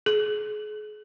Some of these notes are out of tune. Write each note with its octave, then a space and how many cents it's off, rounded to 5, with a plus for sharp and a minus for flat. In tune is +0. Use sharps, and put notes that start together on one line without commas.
G#4 +35